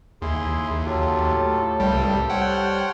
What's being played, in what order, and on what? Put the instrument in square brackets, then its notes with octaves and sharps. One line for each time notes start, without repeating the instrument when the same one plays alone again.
[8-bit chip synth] D#2 [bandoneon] E4 G#4 C6
[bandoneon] F#3 F4 G4 [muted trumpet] A4
[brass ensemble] A2
[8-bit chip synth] C2 G3 [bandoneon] G2 G5
[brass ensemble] G3 [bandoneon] C5 C#5 F6 [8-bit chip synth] F#5 G5